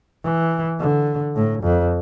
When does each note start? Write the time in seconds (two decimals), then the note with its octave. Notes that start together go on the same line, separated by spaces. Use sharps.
0.24 E3
0.80 D3
1.36 A2
1.64 F2